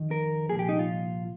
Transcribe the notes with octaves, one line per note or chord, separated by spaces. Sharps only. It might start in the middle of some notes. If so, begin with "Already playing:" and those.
Already playing: F2 D#3
A#4
C2 A#2 F3 G#4
G4
D#4
F4